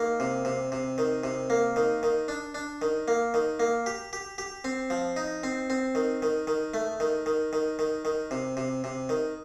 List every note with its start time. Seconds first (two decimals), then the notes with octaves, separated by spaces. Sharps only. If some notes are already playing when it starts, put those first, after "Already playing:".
Already playing: D#3 A#3
0.20 C3
0.45 C3
0.72 C3
0.98 D#3
1.24 C3
1.50 A#3
1.76 D#3
2.03 D#3
2.28 D4
2.55 D4
2.82 D#3
3.08 A#3
3.34 D#3
3.60 A#3
3.86 G4
4.13 G4
4.38 G4
4.64 C4
4.90 F3
5.16 D#4
5.43 C4
5.70 C4
5.95 D#3
6.22 D#3
6.47 D#3
6.74 A3
7.00 D#3
7.26 D#3
7.53 D#3
7.79 D#3
8.05 D#3
8.31 C3
8.57 C3
8.84 C3
9.09 D#3